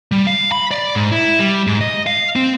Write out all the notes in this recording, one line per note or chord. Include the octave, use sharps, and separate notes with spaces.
G3
F5
B5
D5
G#2
E4
G3
G#2
D#5
F5
C4